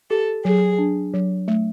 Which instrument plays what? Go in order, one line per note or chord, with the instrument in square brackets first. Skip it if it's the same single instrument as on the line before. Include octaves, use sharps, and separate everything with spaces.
[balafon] G4 [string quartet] A4
[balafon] F#3 [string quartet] G#4
[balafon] D4
F#3
A3